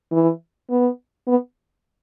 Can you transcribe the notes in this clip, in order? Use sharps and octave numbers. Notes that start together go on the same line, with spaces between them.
E3
B3
B3